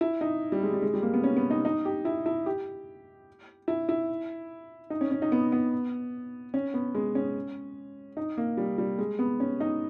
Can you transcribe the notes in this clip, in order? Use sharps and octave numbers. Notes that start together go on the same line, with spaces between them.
E4
D#4
G3
G#3
G3
G#3
G3
A#3
B3
C#4
B3
D#4
D#4
G4
E4
E4
G4
E4
E4
D#4
C#4
C#4
D#4
B3
B3
C#4
B3
G#3
C#4
D#4
A#3
G3
G3
G#3
B3
C#4
D#4